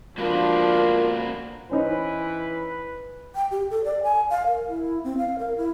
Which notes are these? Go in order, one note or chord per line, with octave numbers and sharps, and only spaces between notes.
F3 A#3 D4 F4 F#4 A#4 B4
E3 C#4 D#4 B4 C5
G5
G4
A4
D5
G#5
F5
A#4
E4
C4
F5
A#4
E4